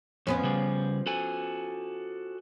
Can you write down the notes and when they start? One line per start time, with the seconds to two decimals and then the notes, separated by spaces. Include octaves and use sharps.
0.27 F2 F3 B3 C#4
0.43 C#3 G3 G#4
1.06 F#4 A4 G#5